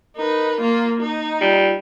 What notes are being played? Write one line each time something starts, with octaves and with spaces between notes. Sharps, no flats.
D#4 A#4 B4
A#3 F4
D#4
G3 F4